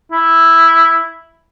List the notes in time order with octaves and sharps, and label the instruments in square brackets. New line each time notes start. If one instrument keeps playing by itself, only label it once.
[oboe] E4